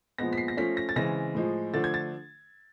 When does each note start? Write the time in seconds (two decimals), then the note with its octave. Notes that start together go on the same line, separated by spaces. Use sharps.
0.18 A#2 F3 G#3 B3 A#6
0.33 B6
0.37 C7
0.48 A#6
0.57 F3 A3 C#4 F4 B6
0.77 A#6
0.89 A6
0.96 C#3 E3 G#3 C4 A#6
1.35 A2 F3 G#3
1.74 D3 F3 A3 D4 A6
1.84 G#6
1.94 A6